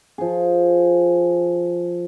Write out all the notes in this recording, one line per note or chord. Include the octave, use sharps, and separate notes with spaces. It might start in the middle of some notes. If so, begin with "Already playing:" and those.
F3 G#4